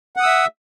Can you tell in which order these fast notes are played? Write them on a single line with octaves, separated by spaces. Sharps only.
F#5 D#6 E6 E5